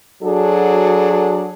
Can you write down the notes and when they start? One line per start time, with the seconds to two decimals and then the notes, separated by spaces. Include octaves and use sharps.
0.22 F#3 D4 F#4 G#4 A4